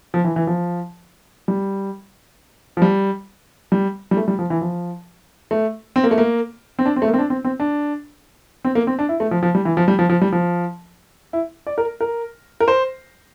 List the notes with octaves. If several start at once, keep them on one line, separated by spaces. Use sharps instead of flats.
F3
E3
E3
F3
G3
F3
G3
G3
G3
A3
G3
F3
E3
F3
A3
C4
A#3
A3
A#3
C4
D4
C4
A3
A#3
C4
D4
C4
C4
D4
C4
A#3
C4
D4
E4
A3
F3
F3
G3
E3
F3
G3
F3
F3
G3
F3
E4
D5
A#4
A#4
A#4
C5